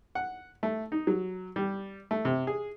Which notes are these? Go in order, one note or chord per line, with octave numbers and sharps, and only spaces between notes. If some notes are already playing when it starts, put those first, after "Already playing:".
F#5
A3
D#4
F#3
G3
A3
C3
G#4